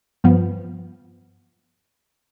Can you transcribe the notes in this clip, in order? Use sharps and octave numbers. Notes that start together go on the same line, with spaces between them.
G2 F3 B3